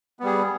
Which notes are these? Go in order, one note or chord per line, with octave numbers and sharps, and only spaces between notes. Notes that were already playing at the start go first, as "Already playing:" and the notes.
G3 B3 G#4